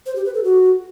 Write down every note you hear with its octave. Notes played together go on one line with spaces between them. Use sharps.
C5
G4
B4
A4
F#4